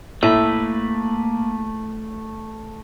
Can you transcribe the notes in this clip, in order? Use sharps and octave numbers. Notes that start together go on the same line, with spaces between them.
A2 A3 A#3 B4 E5